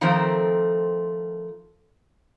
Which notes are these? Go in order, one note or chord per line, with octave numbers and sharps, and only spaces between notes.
D#3 F3 A3 C4 A#4 C5